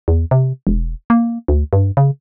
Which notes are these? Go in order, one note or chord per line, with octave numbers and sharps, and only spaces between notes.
E2
C3
E1
A#3
D2
G2
C#3